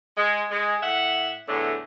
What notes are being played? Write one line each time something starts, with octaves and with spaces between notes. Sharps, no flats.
G#3
G#3
A2 E5 F#5
E2 A2 D3 A3